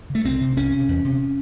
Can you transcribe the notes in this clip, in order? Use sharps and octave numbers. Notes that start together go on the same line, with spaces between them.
C#3
A3
C2 C4
C3
C2 C#4
C3
E2
C3